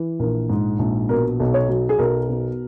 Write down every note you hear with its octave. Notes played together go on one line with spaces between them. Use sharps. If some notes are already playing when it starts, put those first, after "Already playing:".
Already playing: E3
A#1 A#4
G#2
A#1
B2 A#4
B1
C#5
F#3
G#4
B1 A#4
B2